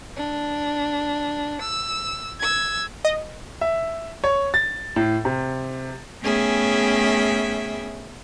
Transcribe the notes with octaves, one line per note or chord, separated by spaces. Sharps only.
D4
E6
E6 G#6
D#5
E5
C#5
A6
A2
C3
A3 B3 C#4 G#4 E5 G5